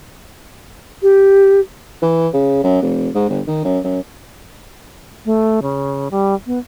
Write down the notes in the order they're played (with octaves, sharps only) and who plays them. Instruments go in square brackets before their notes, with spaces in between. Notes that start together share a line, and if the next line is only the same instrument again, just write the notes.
[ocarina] G4
[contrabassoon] E3
C#3
F#2
F1
G#2
G1
D#3
F#2
F#2
[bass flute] A3
C#3
G3
B3